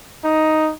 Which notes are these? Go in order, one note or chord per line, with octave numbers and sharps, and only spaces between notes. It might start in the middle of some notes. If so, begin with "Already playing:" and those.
D#4